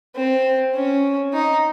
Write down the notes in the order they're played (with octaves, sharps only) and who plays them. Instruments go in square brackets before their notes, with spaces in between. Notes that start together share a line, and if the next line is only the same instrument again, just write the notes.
[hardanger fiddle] C4
C#4
D#4